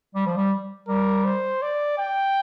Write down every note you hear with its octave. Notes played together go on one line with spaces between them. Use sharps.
G3
F3
G3
G3 A#4
C5
D5
G5